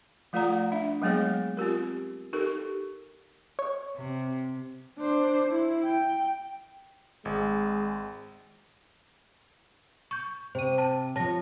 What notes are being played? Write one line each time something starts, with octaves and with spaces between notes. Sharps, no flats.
F3 A3 F4 D5 F#5 A#5
D4 E5
F#3 G#3 A#3 B3 G#4 C#5
C4 F4 G4 A#4
D#4 G4 A4 A#4
C#5
C3
D4 C5
E4
G5
G#1 G#3
C#6 G6
C3 C5 D#7
A5
F3 C#5 A5 A#6